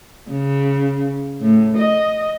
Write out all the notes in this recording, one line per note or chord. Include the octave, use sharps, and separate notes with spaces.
C#3
A2
D#5